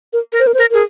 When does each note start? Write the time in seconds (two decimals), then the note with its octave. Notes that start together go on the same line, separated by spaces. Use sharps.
0.13 A#4
0.32 A#4
0.39 C5
0.47 A#4
0.54 C5
0.58 A#4
0.71 G#4 A#4